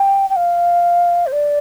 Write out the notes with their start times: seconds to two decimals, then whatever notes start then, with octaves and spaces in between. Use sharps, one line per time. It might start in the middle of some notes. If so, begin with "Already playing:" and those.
Already playing: G5
0.29 G5
0.36 F5
1.26 C5
1.32 D5